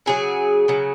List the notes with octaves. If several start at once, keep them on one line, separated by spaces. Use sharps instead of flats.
C#3 F#3 G#4
C#3 F#3